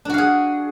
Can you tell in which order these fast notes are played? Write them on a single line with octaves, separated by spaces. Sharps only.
D4 F#4 F5 G#4